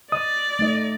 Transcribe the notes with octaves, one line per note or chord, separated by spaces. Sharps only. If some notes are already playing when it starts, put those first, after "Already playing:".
D5 D#5 D#6
A3 D#4 D#5